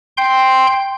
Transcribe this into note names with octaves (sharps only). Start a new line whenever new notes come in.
G5 C6 G6